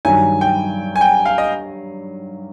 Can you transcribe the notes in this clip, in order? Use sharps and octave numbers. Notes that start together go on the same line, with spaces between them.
G2 D#3 F#3 G#5
G5
G#5
G5
F5
D#5